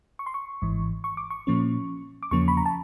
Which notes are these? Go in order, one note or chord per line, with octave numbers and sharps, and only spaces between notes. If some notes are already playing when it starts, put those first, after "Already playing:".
C#6
C6
C#6
G#1 G#2 E3
C#6
D6
C#6
A#2 F3 A#3 C#4
D6
E2 C#3 F3 A#3 C#4 C#6
B5
A#5
A5